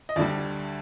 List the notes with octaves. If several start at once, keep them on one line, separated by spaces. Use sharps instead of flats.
D#5
D2 D3 G3 D5